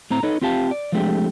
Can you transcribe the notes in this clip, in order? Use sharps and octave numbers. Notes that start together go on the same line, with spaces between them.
A2 C4 A#5
D#4 A4 B4 C#5 D#5
C4 F4 G4 F5 A5
D5
F3 G#3 A3 C4 D4 G4